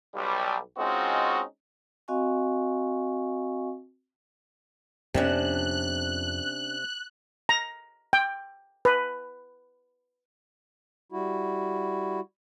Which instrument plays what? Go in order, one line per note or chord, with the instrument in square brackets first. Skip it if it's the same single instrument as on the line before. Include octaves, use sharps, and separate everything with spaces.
[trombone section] B1 G3
G#3 C4 C#4 D#4 F4 F#4
[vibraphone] C4 F#4 D#5 F5 G#5 C#6
[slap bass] F2 B3 [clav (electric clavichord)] C3 [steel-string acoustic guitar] C#4 D4 A5 [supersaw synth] F#6
[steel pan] A#5
G5
B4
[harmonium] G3 E4 F#4